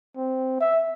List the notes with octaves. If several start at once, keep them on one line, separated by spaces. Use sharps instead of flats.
C4
E5